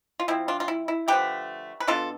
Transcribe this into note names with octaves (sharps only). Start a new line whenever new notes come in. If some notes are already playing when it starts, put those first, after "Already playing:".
F4
F3 C4 E4
D4 F4
F4
E4
E4
D3 F3 A3 G4 B4
B4
B2 B3 D4 F4 A4